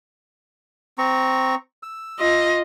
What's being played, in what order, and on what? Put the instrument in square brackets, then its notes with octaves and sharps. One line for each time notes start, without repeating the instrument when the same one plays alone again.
[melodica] C4 A#5 C#6
E6
[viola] F4 D#5